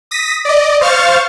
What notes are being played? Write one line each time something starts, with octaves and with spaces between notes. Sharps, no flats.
D#6 A#6 B6
D5 D#5
C5 F5 C#6 F6 A6